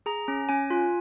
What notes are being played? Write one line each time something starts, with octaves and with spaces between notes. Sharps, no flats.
G#4 A#5
C#4
C#4 G#5
F4